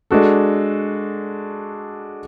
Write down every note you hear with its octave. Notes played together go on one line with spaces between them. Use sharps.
G#3 D4 F#4 A4